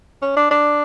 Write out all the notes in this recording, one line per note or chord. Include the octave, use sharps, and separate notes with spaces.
C#4
D4
D4